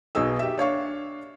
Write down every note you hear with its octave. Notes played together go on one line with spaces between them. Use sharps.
B1 B2 D#4 G#4 E6
G4 E5
D4 C#5 F5 C#6